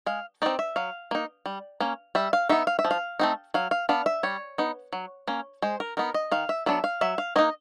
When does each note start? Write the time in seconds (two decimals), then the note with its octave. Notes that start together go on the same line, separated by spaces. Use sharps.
0.06 G#3 F5
0.42 C4 D#4 D5
0.59 E5
0.76 F#3 F5
1.11 A#3 D#4
1.46 G3
1.80 A#3 C#4
2.15 G3 E5
2.33 F5
2.49 B3 D#4 E5
2.67 F5
2.79 E5
2.85 F3
2.91 F5
3.19 A3 C4 D#4
3.54 F#3 F5
3.71 F5
3.89 B3 D4 F5
4.06 E5
4.23 G3 C#5
4.58 B3 D#4
4.93 F#3
5.28 A#3 C#4
5.62 G#3 C5
5.80 A#4
5.97 B3 D#4 A#4
6.14 D#5
6.31 D#3 F5
6.49 E5
6.66 F#3 B3 D4 E5
6.84 F5
7.01 F#3 E5
7.18 F5
7.36 A#3 D#4 D#5